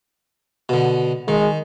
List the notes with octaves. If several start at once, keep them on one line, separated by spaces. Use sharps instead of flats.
B2 D3
D#3 G#3